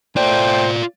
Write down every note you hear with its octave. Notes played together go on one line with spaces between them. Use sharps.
A3 F4 C5 D5 G5